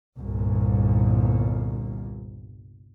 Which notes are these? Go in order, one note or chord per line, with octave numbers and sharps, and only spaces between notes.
G1 C2 A#2